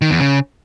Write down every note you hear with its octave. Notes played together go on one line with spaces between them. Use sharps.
D#3
E2
C#3